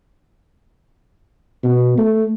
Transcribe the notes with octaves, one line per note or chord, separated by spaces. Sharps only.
B2
A3